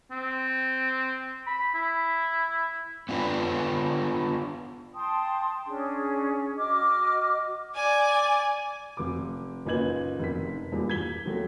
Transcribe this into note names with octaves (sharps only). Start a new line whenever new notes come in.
C4
B5
E4
B3 D4 F4 B4
G5 A5 C6 D#6
C#4 D4 G#4
F#4 D#5 D6 F6
D5 G#5
F1 D6
F#1 A#2 D#4 B4 G#6 F#7
F1 D#3 B6
E2 G2 A#2
G#6 B6 G7
D#2 F#3 A3